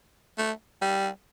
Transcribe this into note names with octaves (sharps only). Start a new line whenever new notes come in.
A3
G3